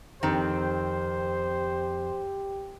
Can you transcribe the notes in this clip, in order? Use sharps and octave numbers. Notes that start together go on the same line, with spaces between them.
F2 D#3 C4 G4 C5